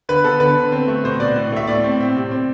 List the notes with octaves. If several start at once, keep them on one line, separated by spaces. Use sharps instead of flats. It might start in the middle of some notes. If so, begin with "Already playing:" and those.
D3 B4
B3 A4
D3 B4
D3
C4
A3
B2 C5
B2 D5
A2
A3 E5
A2 D5
C4
C4
C3
C4